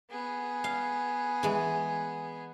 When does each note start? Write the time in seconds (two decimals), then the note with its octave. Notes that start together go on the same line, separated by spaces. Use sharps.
0.11 B3 G#4
0.64 F5
1.43 E3 G#3